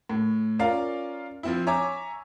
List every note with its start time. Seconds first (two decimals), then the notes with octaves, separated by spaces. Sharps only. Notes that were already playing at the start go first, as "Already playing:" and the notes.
0.09 A2
0.59 C#4 F4 A#4 D5 F5
1.43 F3 C4 E4
1.67 C#5 E5 G#5 A#5 D6